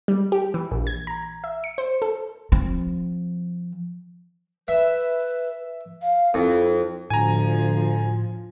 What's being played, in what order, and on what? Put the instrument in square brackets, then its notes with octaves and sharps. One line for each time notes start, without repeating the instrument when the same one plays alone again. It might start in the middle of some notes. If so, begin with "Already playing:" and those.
[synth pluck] G3
G4
E3
A#1
G#6
A#5
E5
C#7
C5
A4
[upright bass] F3 C4
[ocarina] B4 [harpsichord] E5
[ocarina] F5
[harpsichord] F2 [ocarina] E4
[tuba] D2 [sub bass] A2 [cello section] F3 [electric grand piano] G#5 A#5